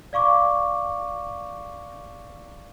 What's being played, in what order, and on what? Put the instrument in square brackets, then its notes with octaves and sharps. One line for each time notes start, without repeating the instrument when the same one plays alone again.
[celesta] D5 F5 C#6 D6